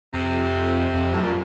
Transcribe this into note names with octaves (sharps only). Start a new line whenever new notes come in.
F2 C3
F2
F#2 A2
A#2